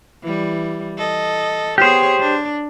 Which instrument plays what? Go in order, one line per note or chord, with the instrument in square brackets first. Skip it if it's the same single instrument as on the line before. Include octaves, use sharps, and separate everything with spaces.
[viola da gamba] E3 G3
A4 D#5
[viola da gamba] B3 G#4 C#5 [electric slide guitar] G4 C5
[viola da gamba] D4